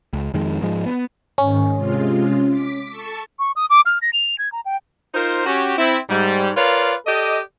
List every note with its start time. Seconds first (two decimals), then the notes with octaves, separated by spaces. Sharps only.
0.13 C#2
0.34 F2 D#3 G#3
0.62 G#2 F3 G#3
0.86 B3
1.38 G#2 D#3 C#4
1.75 C3 G#3 F4
2.49 D6 B6
2.89 A4 A5 C#6
3.39 C#6
3.56 D#6
3.70 D6
3.86 F6
4.02 A#6
4.13 F7
4.38 G#6
4.52 A#5
4.66 G5
5.14 D#4 F4 A#4 C5
5.45 C#4 F#4 G4
5.78 C4 E4
6.09 G#2 G3
6.56 F4 A#4 B4 C#5 D5 F5
7.06 G4 A4 D5 D#5